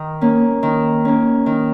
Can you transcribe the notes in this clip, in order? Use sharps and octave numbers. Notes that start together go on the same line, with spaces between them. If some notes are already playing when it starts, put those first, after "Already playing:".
Already playing: D#3
A#3 C#4
D#3
A#3 C#4
D#3